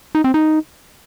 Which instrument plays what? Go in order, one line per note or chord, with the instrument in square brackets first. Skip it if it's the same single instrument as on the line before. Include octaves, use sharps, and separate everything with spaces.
[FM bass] D#4
C4
D#4